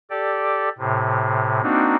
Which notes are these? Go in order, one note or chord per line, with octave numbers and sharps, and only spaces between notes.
G4 A4 D5
A2 C3
A#3 C4 D4 D#4 F#4